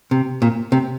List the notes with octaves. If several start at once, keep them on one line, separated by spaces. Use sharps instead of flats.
C3
A#2
C3